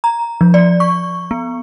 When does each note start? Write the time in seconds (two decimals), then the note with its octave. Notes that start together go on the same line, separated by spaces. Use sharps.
0.04 A#5
0.41 F3
0.54 D5
0.80 C#6
1.31 B3